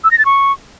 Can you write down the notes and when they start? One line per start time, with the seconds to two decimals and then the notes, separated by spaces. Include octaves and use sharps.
0.04 E6
0.11 A#6
0.18 A6
0.25 C#6